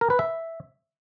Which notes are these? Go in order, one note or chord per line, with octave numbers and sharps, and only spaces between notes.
A#4
B4
E5